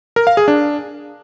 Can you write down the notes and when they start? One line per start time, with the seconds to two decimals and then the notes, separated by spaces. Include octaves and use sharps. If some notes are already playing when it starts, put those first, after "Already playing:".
0.16 A#4
0.27 F5
0.37 G#4
0.48 D4